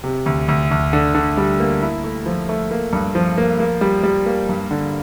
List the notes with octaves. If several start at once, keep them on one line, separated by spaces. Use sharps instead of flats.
C3
D2
D2
D2
D3
D3
G3
A#3
E4
A3
F3
A3
A#3
G2
F3
A#3
A#3
G3
G3
A#3
G2
D3